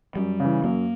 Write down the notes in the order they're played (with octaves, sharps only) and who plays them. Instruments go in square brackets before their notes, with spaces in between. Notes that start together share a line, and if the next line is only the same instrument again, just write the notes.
[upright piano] F#2 [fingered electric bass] G3
[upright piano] C#3 E3
[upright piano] F#2 [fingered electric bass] A#3